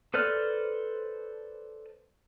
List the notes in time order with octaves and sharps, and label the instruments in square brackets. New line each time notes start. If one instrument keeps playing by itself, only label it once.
[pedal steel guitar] A4 B4 C5 D5 F6